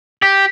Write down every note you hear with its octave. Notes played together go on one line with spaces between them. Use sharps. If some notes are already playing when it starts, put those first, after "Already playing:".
G4